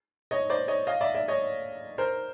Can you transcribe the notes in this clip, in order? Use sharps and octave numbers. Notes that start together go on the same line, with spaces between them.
C#5 D#5
C5 D5
C#5 D#5
D#5 F5
D5 E5
D5 E5
C#5 D#5
A#4 C5